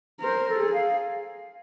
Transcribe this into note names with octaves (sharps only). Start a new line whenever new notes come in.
A#4 C5
A4
G#4
F5